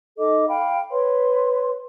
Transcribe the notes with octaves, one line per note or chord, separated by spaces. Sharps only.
D#4 A4 D#5 D6
F5 G5 B5
B4 C#5 C6